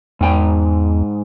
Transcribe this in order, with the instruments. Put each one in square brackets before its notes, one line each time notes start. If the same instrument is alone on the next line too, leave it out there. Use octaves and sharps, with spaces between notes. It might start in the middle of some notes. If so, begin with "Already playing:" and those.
[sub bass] E2 [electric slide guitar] G#2 G5